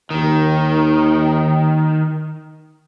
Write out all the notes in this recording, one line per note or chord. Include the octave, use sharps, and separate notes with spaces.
D#2 D#3